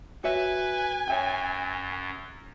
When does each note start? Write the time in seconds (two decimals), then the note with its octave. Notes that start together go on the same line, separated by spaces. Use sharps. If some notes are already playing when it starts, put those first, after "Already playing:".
0.24 F#4 B4 C#5 E5 G#5
1.08 F#2 C#5 E5 G5